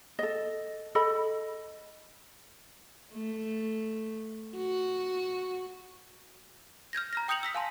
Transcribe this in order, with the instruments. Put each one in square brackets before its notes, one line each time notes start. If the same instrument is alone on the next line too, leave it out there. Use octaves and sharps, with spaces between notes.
[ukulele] A4 D#5
A4 D#5 B5
[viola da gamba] A3
F#4
[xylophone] F6 G6 G#6 A#6
A#5 F6 A#6
G5 D#6 G6 C#7 F7 F#7
E6 A#6 B6
F5 G#5 A5 C6